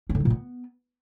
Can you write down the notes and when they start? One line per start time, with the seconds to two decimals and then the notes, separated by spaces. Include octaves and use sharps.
0.09 C#4
0.15 D3
0.20 F#3
0.25 A#2
0.30 B3